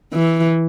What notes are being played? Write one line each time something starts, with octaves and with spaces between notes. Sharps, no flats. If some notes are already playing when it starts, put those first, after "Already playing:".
E3